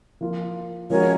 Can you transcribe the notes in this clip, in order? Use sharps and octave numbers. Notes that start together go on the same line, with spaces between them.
F3 A#3 F4
F3 G#3 C#4 F#4 A#4 C#5